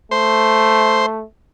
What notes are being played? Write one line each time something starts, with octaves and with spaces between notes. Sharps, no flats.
A3 C5